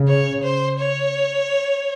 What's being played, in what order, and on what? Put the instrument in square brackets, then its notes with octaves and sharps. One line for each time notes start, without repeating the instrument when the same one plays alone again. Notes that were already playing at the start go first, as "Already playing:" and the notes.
Already playing: [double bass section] C#3
[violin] C#5
C5
C#5